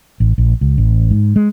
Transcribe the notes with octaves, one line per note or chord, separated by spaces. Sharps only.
A1
A#1
C#2
A1
G#2
G#3